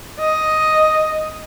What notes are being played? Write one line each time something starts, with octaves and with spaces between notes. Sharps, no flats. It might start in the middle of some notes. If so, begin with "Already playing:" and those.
D#5